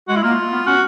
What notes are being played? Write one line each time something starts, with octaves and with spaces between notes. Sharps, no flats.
G#3 F#4
E4
A#3 F4
B3
C#4 F#4